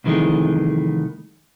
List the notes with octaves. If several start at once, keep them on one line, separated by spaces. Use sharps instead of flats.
C2 F2 D#3 E3 G#3 A3